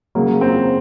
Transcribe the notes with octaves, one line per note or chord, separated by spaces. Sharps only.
C#3 F#3 A#3
C4